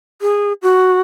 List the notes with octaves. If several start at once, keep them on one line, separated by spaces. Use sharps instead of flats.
G#4
F#4